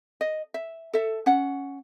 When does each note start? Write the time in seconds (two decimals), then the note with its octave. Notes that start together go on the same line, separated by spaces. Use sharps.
0.21 D#5
0.54 E5
0.93 A4 E5
1.26 C#4 F#5